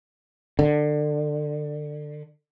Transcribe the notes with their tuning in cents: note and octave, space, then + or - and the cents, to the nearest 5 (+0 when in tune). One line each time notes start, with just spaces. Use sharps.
D3 +25